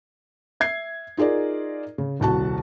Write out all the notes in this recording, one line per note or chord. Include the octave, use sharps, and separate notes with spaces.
E5 G#6 C7
D#4 F4 G#4 A#4 D5
C#3
D#1 C2 F#4 A5